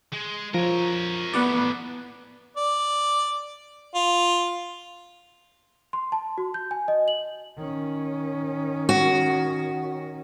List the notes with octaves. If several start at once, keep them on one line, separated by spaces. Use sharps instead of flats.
G#3
F3 A#4 C#5
E3 A3 B3 D5 F#5
D5
F4
C6
A5
F#4
G6
G#5
D#5
F#7
D#3 C#4
F#4